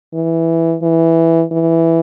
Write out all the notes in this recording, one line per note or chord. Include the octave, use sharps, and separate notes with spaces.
E3
E3
E3